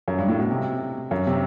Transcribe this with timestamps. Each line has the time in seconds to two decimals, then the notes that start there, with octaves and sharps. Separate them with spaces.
0.08 F#2
0.18 G2
0.28 A2
0.39 B2
0.51 C3
1.11 F#2
1.27 C3